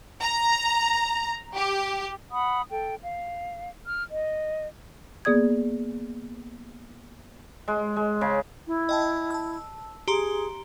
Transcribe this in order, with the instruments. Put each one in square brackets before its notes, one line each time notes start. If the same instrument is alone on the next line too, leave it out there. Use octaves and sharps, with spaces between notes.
[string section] A#5
G4
[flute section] F#5 B5 D#6
A4 G5
F5
F6
D#5
[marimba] A#3 B3 G#4 D5 D#6 G#6
[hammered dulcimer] G#3
G#3
C#3
[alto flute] E4
[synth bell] D#5 G5 A5
A5 E6
[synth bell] G4 A#5 C6 [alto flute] G#4